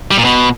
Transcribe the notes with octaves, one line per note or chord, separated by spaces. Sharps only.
G3
A#2
B2